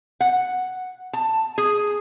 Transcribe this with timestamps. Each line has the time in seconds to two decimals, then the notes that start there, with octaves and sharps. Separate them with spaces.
0.20 F#5
1.13 A5
1.58 G#4